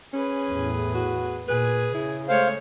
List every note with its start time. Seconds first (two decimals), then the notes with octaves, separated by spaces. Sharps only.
0.13 C#4 G#4 B4
0.50 E2 A2
0.95 F#4
1.48 A#2 G#4 B4 G#5
1.94 C#3 E4
2.29 G#3 A3 C5 C#5 F5